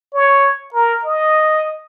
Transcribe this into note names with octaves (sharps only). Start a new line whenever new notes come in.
C#5
A#4
D#5